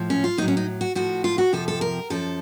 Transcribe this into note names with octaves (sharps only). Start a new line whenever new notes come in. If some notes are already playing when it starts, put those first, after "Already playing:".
Already playing: A2 F3
C#4
F4
A2 F#3 D#4
C#4
D#4
F#4
A2 F3 F#4
F4
F#4
F2 C3 F3 A4
A4
A#4
F#2 F3 A4